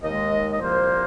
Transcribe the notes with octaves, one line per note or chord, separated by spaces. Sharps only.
D#2 D#3 G#3 D#5
D#5
C2 A#2 F3 A#3 C5